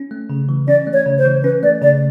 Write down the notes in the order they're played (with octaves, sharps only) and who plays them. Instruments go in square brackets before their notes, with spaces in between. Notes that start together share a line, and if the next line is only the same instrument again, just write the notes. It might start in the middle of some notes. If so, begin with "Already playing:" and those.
Already playing: [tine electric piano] C#4
A3
C#3
E3
[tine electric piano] C#4 [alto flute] D5
[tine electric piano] A3
[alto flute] C#5
[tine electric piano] C#3
[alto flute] C5
[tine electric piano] E3
[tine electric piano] C#4 [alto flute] B4
[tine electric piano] A3 [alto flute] D5
[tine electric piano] C#3 [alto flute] D5